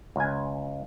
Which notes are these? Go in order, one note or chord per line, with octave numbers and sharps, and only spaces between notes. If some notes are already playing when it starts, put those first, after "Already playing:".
C#2 G#5